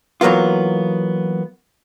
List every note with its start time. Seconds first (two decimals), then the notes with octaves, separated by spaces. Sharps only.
0.21 E3 F#3 A#3 B3 F4